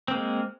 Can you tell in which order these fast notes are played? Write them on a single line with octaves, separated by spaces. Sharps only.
C4 A#3 G#3